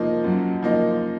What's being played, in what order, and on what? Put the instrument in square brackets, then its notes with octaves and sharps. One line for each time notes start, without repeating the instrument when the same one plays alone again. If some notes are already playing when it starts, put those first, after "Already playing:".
Already playing: [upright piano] F3 A#3 D#4
[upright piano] F#2 [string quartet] F#3
[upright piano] F3 A#3 D#4